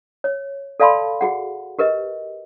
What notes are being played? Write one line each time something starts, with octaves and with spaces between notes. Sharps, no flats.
C#5
A4 D5 F5 A5 B5 C6
F#4 G#4 F#5
G4 A#4 B4 D#5